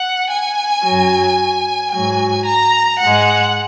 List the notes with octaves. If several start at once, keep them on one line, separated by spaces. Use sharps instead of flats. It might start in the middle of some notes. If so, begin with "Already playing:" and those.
Already playing: F#5
G#5
F#2 F#3
G#2 F#3 G#5
A#5
G#2 G#3 F#5